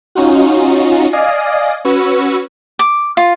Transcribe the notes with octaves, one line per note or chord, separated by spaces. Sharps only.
C#4 D#4 F4 F#4
D5 D#5 F5 G#5 D#6
C#4 F#4 B4 C#6 E6
D6
F4